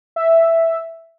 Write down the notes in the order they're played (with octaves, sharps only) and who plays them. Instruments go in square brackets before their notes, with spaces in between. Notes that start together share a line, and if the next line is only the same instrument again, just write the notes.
[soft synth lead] E5